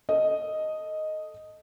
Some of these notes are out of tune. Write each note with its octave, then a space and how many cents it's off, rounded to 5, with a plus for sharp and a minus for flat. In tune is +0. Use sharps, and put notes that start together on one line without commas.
A4 +0 D#5 +0